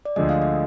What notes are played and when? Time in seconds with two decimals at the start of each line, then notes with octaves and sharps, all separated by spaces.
0.05 D5
0.16 D2 D3 F3 G#3 D#5
0.29 F5
0.42 D#5